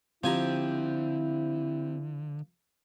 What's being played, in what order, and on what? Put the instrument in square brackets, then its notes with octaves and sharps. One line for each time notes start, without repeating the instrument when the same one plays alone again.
[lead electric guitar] D3 [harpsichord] F3 G#5 A#5 [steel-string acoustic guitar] C4 G4 [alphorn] E4